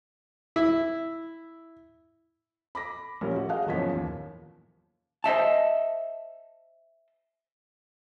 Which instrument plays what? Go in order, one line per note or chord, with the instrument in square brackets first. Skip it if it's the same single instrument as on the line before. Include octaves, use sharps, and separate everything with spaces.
[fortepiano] E4
[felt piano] B5 D6 A#6
A#1 G3 C#4 A#4
F#4
G#4 D#5 F5 F#5
F#1 E2 F3 C#4 B6
D#2
[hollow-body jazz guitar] C5 D#5 E5 A5